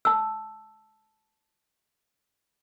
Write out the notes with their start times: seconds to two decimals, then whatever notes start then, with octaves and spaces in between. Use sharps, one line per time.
0.05 A5 E6